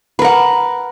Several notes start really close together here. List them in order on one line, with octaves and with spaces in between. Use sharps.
B4 A#4 F#5